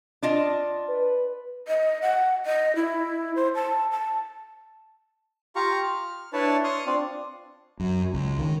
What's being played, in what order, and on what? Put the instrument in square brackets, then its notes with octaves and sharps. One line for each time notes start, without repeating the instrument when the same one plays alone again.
[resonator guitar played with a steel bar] D4 F4 D#5
[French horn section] B4
[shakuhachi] D#5
F#5
D#5
E4
C5
A5
A5
[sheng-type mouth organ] F4 G4 F5 A#5 C#6
F6
D4 E4 B4 C#5 D5 A5
C6 C#6 D#6 F6
C4 D4 F4 D5
[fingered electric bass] F#2
C#2
D#3